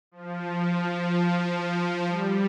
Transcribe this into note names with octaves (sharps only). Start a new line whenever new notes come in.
F3
F3
F3
F3
G3